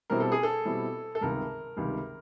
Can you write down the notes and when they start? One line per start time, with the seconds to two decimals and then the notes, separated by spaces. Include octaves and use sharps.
0.10 B2 G3 C4 E4 A#4
0.20 A4
0.32 G#4
0.43 A4
0.65 B2 G3 C4 E4
1.15 A4
1.21 C#2 C3 D#3 G3 A#4
1.77 C#2 C3 D#3 G3